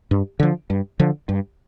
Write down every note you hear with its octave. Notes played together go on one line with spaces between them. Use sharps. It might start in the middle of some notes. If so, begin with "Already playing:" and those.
G2
D3 F3
G2
D3 F3
G2